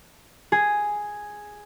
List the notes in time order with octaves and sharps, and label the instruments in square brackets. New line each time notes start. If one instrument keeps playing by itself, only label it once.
[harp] G#4